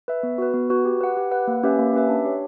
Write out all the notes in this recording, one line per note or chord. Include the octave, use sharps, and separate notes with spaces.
B4 E5
B3
F#4 B4
B3
F#4 B4
G4
B4 F#5
G4
B4 F#5
A#3
C#4 G4 B4 E5
A#3
C#4 G4 B4 E5
D4
G4 C#5